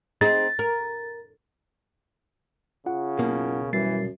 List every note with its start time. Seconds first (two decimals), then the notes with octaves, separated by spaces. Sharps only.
0.21 C4 D#4 G#4 A6
0.59 A#4
2.86 C#3 F4 F#5
3.19 F#1 B2 A#3
3.73 F#2 E3 G3 A6 C7